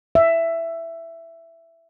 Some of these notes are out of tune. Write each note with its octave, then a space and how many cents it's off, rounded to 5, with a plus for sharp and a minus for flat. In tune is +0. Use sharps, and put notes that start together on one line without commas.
E5 +10